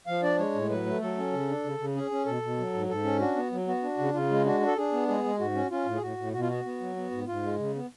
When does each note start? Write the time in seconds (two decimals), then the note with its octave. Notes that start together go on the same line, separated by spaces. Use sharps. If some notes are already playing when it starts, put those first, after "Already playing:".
0.07 F3 F5
0.23 D4 D5
0.39 G#3 C#5
0.55 A2
0.70 F#3 B4
0.86 A3
1.01 F#3 A4
1.17 C#4
1.33 C#3
1.48 D4
1.64 C#3
1.79 C#3
1.95 C#4 G#4
2.11 C#4
2.26 B2 A4
2.42 B2
2.58 F#3
2.73 G#2
2.89 G#2 A4
3.04 C#4
3.20 D4 F#4
3.36 B3
3.52 F#3
3.67 B3 F#4
3.83 D4
3.98 C#3
4.14 C#3 F4
4.29 G#3
4.45 D4 F#4
4.61 D4
4.67 A4
4.76 D4 G#4
4.92 B3
5.08 G#3 G#4
5.24 G#3
5.40 G#2 F#4
5.54 C#4
5.71 C#4 F4
5.86 A2
5.96 G#4
6.01 A2 F#4
6.17 A2
6.33 B2 F#4
6.41 F4
6.49 B3 F#4
6.65 B3
6.80 F#3
6.96 B3
7.11 G#2
7.27 G#2 F4
7.43 G#3
7.59 C#3
7.74 B3